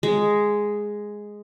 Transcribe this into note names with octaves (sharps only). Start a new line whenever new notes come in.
G#3